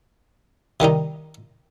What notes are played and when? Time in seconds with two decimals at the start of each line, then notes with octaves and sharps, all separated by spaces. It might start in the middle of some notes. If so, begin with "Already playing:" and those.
0.80 C3 D#3 G3 D#4